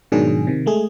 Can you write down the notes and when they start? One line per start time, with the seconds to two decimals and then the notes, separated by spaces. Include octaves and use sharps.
0.12 G#2 B2 D#3 F#3 D4 G#4
0.47 C3 D#3
0.66 G#3 A3 G#4